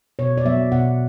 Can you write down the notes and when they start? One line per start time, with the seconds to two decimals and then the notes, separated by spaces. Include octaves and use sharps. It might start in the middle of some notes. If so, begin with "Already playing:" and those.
0.19 B2 C#5
0.38 D5
0.45 F#3 B3 E5
0.72 B2 F#5